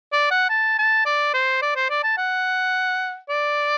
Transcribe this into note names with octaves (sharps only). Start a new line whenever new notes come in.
D5
F#5
A5
A5
D5
C5
D5
C5
D5
A5
F#5
D5